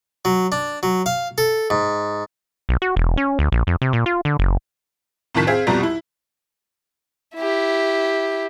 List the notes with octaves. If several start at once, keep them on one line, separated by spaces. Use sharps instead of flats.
F#3
D4
F#3
F5
A4
G#2
B1
F#4
E1
C#4
D2
A#1
F2
C3
A#2
F4
D3
F#1
C2 F2 A2 D#3 A5 B6
C4 G#4 F5
C2 F2 B2 G3 A#5
E4
E4 G4